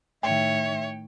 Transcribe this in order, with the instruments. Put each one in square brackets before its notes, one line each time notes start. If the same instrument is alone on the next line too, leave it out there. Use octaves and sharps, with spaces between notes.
[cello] A2 D#3 [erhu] C#5 [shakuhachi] E5 [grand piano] G5